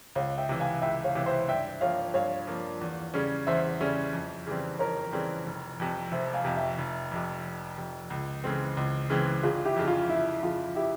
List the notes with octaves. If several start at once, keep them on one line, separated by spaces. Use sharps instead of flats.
C#2 C#5 F5
E5 G5
C3 E3
F5 G#5
C#2 E5 G5
C#5 F5
C3 E3
C5 E5
G2 E5 G5
F3 A#3 C#5 F5
G2 C#5 F5
F3 A#3
E2
C#3 G3 C#4
E2 C5 E5
C#3 G3 C#4
F2
C#3 E3 G3 C4
F2 A#4 C#5
C#3 E3 G3 C4
F1
F2 C3
F1 C5 E5
F5 G#5
F2 C3
E5 G5
F1
F2 C3
F1
F2 C3
C#2
C#3 E3 G#3 C4
C#2
C#3 E3 G#3 C4
G1 F4 G#4
E4 G4
F2 C#3
F4
G1 E4
F2 C#3 F4
E4 G4